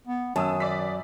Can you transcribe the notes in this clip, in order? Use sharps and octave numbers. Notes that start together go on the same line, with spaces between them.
B3
F#2 D#3 A5 D#6 E6
D5 B6